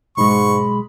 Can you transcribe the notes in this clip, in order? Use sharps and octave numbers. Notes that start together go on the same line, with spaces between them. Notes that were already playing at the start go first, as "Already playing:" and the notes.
B1 G#2 G#3 B5 C#6